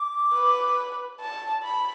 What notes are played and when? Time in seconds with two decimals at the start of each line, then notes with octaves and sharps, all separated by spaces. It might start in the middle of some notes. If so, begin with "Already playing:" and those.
Already playing: D6
0.34 B4
1.20 A5
1.63 B5